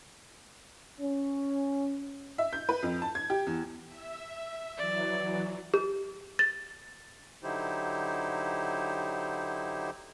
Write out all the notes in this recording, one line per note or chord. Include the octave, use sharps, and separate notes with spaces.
C#4
E5
G6
B4
F2
A5
G#6
G4
E2
E5
E3 F#3 D5
G4
A6
D3 F#3 D#4 E4 G4 C5